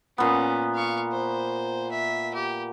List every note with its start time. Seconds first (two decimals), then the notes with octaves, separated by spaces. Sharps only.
0.18 A#2 B3 C#4
0.75 F5 C#6
1.12 C5
1.92 E5
2.34 G4